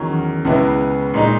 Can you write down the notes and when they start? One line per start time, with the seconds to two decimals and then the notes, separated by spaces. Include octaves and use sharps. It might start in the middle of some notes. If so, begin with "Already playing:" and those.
Already playing: E2 D#3 F#3 C#4
0.45 C#2 C#3 G#3 B3 E4
1.14 A#2 G#3 D#4